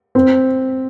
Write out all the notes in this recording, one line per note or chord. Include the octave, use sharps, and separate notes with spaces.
C4